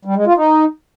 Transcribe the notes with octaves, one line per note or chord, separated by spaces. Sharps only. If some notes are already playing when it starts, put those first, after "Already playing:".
G3
G#3
F4
D#4